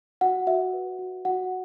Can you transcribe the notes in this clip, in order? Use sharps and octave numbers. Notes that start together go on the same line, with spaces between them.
F#4 F#5
F#4 E5
B4
F#4
F#4 F#5